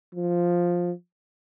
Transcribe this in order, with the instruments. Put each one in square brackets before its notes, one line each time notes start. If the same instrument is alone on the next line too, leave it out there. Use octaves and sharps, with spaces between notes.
[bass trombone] F3